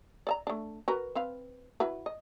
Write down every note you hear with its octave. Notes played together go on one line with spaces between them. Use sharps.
D5 E5 A#5
A3 D4
F#4 A#4 B4
C4 B4 F5
E4 F#4 B4
D#5